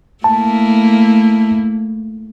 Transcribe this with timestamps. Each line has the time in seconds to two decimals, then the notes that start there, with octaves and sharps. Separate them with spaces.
0.24 A3 A#3 E4 A5